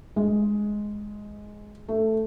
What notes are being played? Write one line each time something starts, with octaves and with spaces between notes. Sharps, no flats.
G#3
A3